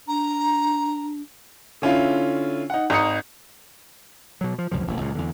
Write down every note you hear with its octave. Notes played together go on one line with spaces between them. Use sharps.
D4 A#5
D3 C#4 E4 F4
D#4 F#5
G#1 D#4 A#5 D#6 C#7
B2 F#3
F3
C#2 F#2 C3 F3
E1 A1 D#2
C#2 A#2 C#3
E2 D3